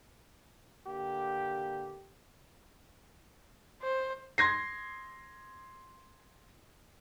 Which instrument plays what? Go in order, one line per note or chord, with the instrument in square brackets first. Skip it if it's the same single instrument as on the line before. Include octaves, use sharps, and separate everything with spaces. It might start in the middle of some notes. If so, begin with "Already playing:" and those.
[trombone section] D3 A#3 G4
[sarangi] C5
[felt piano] C6 G#6 A#6 C7